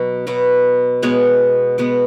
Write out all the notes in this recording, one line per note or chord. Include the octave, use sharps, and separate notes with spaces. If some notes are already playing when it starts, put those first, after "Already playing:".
Already playing: B2 F#3 B3
B2 F#3 B3
B2 G#3 B3 C#5
B2 G#3 B3